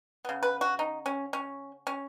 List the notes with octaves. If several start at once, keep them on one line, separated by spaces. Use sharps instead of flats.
C#3 B3
B4
F#4
D#4
C#4
C#4
C#4